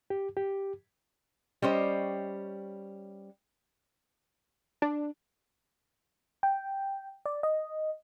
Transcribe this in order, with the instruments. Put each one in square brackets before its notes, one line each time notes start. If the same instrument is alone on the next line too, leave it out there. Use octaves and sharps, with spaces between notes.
[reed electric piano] G4
G4
[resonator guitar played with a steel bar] G3 C#4 C5 D#5
[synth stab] D4
[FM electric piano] G5
D5
D#5